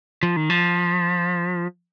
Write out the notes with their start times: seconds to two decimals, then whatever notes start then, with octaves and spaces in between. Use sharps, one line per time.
0.23 F3
0.36 D#3
0.50 F3